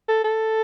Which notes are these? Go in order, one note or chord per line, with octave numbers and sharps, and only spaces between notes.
A4
A4